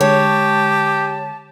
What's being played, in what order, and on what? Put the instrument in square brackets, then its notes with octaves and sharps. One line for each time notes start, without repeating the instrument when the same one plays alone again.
[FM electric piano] D3 G#3 [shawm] G4 [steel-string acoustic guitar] C#5 [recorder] A5